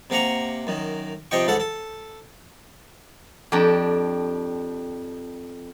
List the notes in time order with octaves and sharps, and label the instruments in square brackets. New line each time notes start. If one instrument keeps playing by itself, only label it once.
[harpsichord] C3 A#3 F#5 A#5 C#6
F#2 D#3
C3 F3 D#5 G5 C#6
C#2 G#2 A4 F#5
A4
[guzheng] F2 D4 G4 A#5